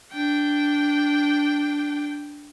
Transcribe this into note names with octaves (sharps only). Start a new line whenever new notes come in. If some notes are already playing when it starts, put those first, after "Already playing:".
D4 G5